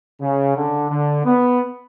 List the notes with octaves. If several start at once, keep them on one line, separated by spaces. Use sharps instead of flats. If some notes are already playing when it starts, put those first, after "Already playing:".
C#3
D3
D3
B3